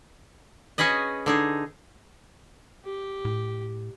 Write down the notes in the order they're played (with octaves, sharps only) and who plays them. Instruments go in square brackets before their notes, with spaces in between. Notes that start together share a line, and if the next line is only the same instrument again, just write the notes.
[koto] C#4 F#4 G#4 B4 D#5
D3 D#4 G#4
[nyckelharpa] G4
[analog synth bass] A2